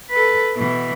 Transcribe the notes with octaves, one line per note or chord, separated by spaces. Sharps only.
A4 B4
B2 E3